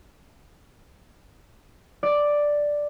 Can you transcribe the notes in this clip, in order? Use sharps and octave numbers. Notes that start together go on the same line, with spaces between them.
D5